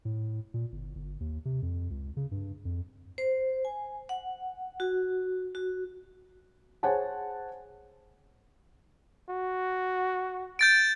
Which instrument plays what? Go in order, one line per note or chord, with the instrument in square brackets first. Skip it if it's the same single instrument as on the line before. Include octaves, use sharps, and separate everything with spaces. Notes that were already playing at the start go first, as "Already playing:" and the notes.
[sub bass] A2
A#2
G1
G1
D#2
C3
F2
C#2
C#3
G2
F2
[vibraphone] C5
G#5
F#5
F#4
F#4
[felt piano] G#4 C5 C#5 F#5 G#5 A5
[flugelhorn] F#4
[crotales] G6 A6 D7